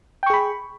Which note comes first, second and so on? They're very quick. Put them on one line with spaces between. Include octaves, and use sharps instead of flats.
G5 C#6 G#4 B5